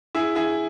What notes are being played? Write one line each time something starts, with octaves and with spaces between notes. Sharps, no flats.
E4 G#4
E4 G#4